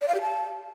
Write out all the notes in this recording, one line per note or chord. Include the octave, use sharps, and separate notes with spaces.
D5
F5
G4
A5